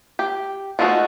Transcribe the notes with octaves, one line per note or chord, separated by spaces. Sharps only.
G4
F3 G#3 A3 D#4 F#4